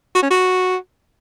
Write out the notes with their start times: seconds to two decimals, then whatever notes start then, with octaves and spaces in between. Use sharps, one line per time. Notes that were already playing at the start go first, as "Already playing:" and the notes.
0.15 F#4
0.23 C#4
0.30 F#4